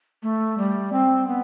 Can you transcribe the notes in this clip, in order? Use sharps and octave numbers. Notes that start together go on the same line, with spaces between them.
A3
G3
C4
B3